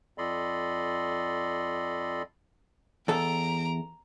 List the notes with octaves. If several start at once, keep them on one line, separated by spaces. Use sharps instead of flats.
F2 A4 D5 D#5 B5 C6
E2 A4 A#5 D7